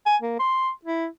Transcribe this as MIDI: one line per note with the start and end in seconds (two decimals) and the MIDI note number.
0.06 0.17 80
0.22 0.36 58
0.39 0.70 84
0.85 1.07 64